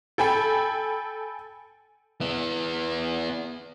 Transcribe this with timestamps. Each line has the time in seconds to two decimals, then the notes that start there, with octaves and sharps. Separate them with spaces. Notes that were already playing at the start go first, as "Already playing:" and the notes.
0.18 A4 G5 G#5 B5
2.21 B3 E4